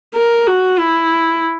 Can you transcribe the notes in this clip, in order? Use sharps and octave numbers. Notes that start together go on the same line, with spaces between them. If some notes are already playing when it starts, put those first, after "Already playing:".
A#4
F#4
E4